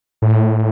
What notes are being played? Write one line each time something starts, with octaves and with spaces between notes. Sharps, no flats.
A2